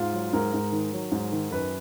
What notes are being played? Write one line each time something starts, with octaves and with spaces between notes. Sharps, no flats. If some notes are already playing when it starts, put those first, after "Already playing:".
Already playing: G#2 F4
F#3
G#2 A#4
G#2
D#3
F#3
G#2
D#3
F#2 B4